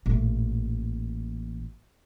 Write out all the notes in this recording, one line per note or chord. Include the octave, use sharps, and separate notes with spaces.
A1 A#2